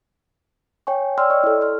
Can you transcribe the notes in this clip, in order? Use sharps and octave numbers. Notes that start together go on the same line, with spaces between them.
C#5 G5 G#5 C#6
C#5 D5 G5 C6 E6 F6
D5 D#5 C#6
E4 A4
C6 F6